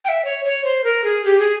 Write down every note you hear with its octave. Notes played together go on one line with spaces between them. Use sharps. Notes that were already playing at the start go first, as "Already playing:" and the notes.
G5
E5
C#5
C#5
C5
A#4
G#4
G4
G#4